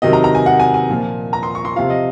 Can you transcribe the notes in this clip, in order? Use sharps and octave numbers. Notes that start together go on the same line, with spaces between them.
C3 D#3 F#3 D#5
A#5
A#5
G#5
F#5
G#5
G#5
A#2 F3
A#5
C6
C#6
C6
C3 F3 F5
D#5